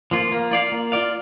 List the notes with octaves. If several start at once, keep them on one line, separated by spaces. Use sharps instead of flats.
F3 A#3 F4
A#3
F4 D5 F5
A#3
F4 D5 F5